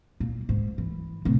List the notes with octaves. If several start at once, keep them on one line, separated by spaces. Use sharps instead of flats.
A#2
G#2
E3
A2 C3